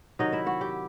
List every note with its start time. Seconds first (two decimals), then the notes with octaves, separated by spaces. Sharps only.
0.19 C3 D#3 F#3 D#4 D#5
0.33 E4 E5
0.46 F#4 F#5
0.61 G4 G5